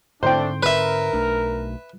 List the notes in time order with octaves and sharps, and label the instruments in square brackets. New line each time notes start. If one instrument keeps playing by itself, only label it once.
[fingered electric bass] G#2 D3 C4 [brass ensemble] A3 D4 [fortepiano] C5 G5
[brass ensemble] A#4 [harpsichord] B4 E5
[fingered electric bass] B1 A3 D4